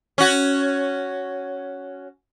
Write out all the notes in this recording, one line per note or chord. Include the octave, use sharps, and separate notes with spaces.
C#4 F#4